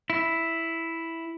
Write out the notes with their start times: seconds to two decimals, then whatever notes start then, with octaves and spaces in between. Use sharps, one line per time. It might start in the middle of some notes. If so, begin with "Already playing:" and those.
0.10 E4